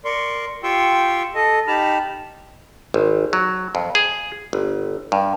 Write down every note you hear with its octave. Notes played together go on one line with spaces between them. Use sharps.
A#4 D5 C6 C#6
F4 G4 G5 C6 C#6 E6
A4 D#5
D#4 G4 A5 B5 F6
G#1
F#3
F2
G#4
G1
G2